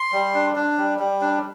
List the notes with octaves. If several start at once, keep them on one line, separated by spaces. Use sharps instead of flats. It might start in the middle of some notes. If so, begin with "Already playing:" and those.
Already playing: C6
G3
D4
D4
G3
G3
D4